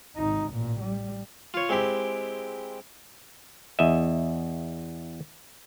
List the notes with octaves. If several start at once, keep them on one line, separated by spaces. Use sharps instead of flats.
G#1 D#4
A1 A#2
G3
F4 C#5
G#3 C4 E4 G4 G5
E2 D#5 E5